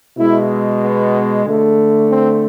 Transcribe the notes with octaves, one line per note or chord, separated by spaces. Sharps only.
B2 G#3 E4
B3
D3 A3
C4